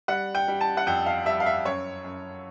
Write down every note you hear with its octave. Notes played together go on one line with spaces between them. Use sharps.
G3 F#5
G5
G3
A5
F#5
F2 G5
F5
G3 E5
F5
E5
F#2 C#5
F#2